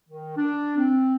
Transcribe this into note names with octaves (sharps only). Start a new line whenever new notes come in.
D#3
D4
C4